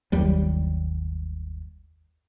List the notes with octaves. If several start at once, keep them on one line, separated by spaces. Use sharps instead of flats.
G1 D#2 F#3 G3